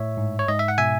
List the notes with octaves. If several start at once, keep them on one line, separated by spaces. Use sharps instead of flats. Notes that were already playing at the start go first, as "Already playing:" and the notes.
Already playing: A2 C#5 E5
G#2
C#5
G#2 D#5
E5
F#5
B2 E5 G#5